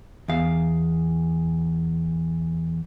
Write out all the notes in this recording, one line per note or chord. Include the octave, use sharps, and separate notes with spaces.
E2 F5